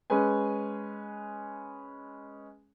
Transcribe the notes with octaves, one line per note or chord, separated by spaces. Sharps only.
G#3 C#4 G#4 B4 G#5